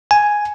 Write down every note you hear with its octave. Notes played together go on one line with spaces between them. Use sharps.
G#5